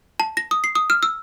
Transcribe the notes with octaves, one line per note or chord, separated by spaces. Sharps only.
A5
A#6
D#6
C7
D#6
F6
E6